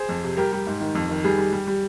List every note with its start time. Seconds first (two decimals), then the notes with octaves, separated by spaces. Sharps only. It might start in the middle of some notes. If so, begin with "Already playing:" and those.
Already playing: G#4 C5
0.09 F2
0.23 C3
0.37 G3 G4 A#4
0.52 G3 G4
0.67 G#2
0.81 D#3
0.95 F2
1.09 D#3
1.24 G3 G#4
1.38 G3
1.53 G3
1.67 G3